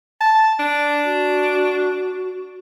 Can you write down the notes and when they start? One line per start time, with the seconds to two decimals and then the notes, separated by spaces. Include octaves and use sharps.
0.21 A5
0.60 D4
1.05 F#4